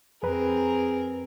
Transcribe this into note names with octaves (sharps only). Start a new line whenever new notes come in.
F2 C4 G#4 A#4 B4 A#5